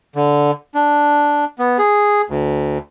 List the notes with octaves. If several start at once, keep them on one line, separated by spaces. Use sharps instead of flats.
D3
D4
B3
G#4
D2